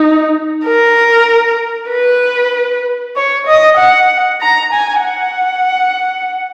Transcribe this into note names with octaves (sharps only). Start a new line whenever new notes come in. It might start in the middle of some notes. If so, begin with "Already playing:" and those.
Already playing: D#4
A#4
B4
C#5
D#5
F#5
A#5
G#5
F#5